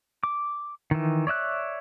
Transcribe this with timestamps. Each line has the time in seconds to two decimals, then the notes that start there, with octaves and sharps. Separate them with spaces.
0.23 D6
0.91 D#3 E3
1.27 C#5 D5 E5 F#6